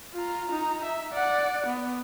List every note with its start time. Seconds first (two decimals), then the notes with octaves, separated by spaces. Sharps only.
0.15 F4 A#5
0.49 D#4 A#5
0.84 E5
1.13 D5 F#5
1.67 B3